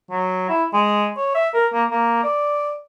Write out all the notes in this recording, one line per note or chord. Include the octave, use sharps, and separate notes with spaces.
F#3
E4
G#3
C#5
E5
A#4
A#3
A#3
D5